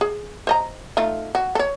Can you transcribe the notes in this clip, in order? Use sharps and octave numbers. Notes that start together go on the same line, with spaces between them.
G#4
C5 D#5 A#5
A3 D#4 F4
F#4
A4 C#5